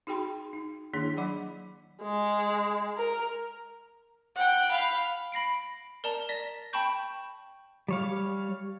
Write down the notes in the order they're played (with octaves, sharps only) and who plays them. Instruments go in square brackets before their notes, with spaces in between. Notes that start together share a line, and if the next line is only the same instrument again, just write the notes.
[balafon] D#4 F#4 G#4 G5 B5 C6
D#4
D#3 A#3 D4 E4 G#4 C#5
F#3 D5 F#5 B5 D6
[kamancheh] G#3
A#4
F#5 G5
F5 B5
[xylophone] B5 A#6 C7 D7
A#4 D5 A5 A#5
D5 A#6 B6
G5 A5 B5 C#6 G6
[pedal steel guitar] G3 C#5 F5